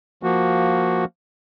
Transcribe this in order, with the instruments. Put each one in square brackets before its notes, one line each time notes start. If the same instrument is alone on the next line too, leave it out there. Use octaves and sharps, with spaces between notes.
[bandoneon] F3 A#3 F#4